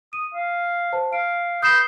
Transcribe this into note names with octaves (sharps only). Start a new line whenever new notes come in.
D#6 D#7
F5
C5 A5
F5 D7
B4 D#6 G6 C7 E7